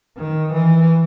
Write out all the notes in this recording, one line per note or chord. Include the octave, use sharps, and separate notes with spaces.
D#3
E3